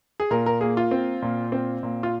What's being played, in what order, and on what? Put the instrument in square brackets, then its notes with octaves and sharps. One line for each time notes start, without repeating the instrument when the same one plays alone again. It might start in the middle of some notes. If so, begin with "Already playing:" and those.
[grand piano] G#4
A#2 A#4
A#4
A#3 G#4
F4
C4
A#2
C4
A#2
F4